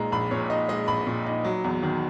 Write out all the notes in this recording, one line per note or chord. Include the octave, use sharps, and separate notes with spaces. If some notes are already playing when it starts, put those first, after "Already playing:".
Already playing: A#1 A#2 G#3 D#4 A#5
A#1 B5
A#2 C#5
D#4 D#5
G#3 D#5
A#1 B5
A#2
D#4
F#3
E2
D#3